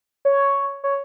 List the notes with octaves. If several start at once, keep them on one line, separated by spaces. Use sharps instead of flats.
C#5
C#5